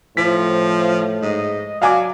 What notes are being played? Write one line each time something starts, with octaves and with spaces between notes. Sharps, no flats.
A2 F3 C5 B6
G#2 D#5
F#3 D5 F5 G#5 D6